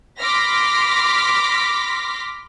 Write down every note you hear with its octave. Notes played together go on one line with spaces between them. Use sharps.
B5 C6 D6 F6 A#6 B6